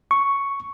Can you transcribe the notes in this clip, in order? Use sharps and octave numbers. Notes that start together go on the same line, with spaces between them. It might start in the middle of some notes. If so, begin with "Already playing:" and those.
C#6